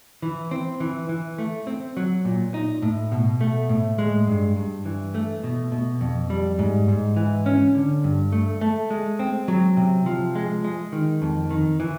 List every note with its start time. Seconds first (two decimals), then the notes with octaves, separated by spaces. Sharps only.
0.22 E3
0.51 C4
0.80 E3
1.09 E3
1.38 A3
1.67 C4
1.97 F#3
2.25 A#2
2.54 D#4
2.82 A2
3.12 B2
3.41 A3
3.69 A2
3.98 G#3
4.27 G2
4.56 G2
4.85 E3
5.15 A3
5.44 B2
5.72 B2
6.01 F2
6.30 G3
6.59 G#2
6.88 G#2
7.16 E3
7.46 C#4
7.75 D3
8.04 G2
8.32 A3
8.61 A3
8.90 G#3
9.19 C4
9.48 F#3
9.77 C3
10.06 F3
10.35 G#3
10.64 G#3
10.92 D#3
11.22 F2
11.50 D#3
11.80 E3